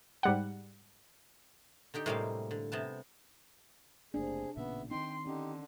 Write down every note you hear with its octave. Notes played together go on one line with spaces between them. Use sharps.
G#2 G3 F#5
D3 D#4 G4 G5
A2 C3 G3 G#3 A#3 F5
D3
C3 B3 A5
F#1 C3 A3 A#3 D4 G#4
A1 A#2 C#3 B3 E5
D#3 C4 D#4 G5 C6
D3 C#4 D#4 G4